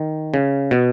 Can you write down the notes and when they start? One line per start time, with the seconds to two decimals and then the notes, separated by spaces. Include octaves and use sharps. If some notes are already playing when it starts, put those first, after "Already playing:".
Already playing: D#3
0.34 C#3
0.71 B2